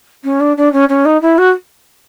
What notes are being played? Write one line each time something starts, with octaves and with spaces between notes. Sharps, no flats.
C#4
D4
D4
C#4
C#4
D#4
E4
F#4